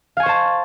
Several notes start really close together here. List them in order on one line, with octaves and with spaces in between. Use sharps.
F5 G#5 C#6 C5 A5